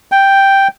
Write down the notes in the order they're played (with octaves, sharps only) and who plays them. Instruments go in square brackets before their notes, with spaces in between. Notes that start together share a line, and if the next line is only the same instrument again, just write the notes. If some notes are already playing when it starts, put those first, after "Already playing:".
[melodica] G5